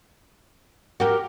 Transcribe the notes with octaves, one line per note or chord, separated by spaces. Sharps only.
F#4 G4 A#4